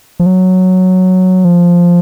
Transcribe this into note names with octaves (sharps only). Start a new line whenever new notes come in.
F3
F#3
F3